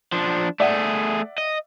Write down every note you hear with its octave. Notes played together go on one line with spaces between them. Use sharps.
F3 D4
A3 G#4 D5 E5 F#5
D#5